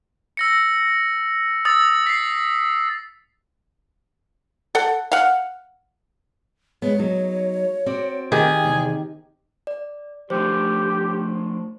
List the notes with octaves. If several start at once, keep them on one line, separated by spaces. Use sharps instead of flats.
E6 A#6 C#7
D#6 E6 A6
B6 C7
A4 F#5
F5 F#5
G#3 B3 C#5
F#3 D#4
C4 F#4 D5
D#3 G4 G#4
E2 C3
D5
F3 A3 D4 G4 C5